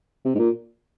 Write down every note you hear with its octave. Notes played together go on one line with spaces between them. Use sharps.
C3
G#2
A#2